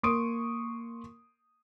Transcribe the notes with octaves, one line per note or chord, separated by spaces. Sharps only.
A#3 C6 C#6 D#6 D7